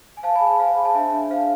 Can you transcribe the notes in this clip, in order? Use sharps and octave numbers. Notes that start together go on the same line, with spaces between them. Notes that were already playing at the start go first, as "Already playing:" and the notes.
G#5
C5 F5 A5
G#5 B5
G#4
G#5 B5
C5 F5
G#4
A5
D4 E5 G#5
D4
C5 F5